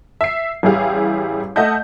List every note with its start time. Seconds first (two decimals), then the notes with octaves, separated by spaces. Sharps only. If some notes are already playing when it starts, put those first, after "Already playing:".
0.21 E5 C7
0.63 A1 G3 E4 G4 G#4 F5
1.56 A3 D#5 E5 F#5 A5 G6